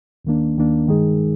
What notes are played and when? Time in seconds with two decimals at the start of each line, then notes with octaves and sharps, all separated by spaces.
0.25 D#2 D#3 A#3 D4
0.57 D#2 D#3 A#3 D4
0.88 G2 D#3 G#3 D#4 G#4